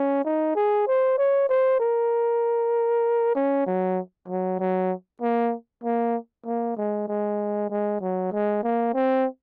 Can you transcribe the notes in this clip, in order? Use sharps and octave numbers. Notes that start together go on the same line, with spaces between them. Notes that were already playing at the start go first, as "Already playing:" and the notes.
Already playing: C#4
D#4
G#4
C5
C#5
C5
A#4
C#4
F#3
F#3
F#3
A#3
A#3
A#3
G#3
G#3
G#3
F#3
G#3
A#3
C4